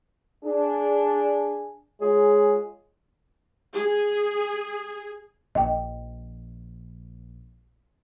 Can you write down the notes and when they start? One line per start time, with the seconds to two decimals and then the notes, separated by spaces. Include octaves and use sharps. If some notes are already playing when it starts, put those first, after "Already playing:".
0.44 D4 G#4
2.01 G#3 F4 G#4 C#5
3.74 G#4
5.55 A#1 D#5 G5